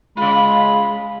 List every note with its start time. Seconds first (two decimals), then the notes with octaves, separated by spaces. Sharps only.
0.17 C#3 G#3 F4 B5